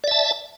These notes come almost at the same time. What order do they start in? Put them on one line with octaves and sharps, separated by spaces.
D5 E5 A5